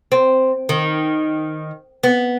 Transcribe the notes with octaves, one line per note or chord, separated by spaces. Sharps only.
C4
D#3
B3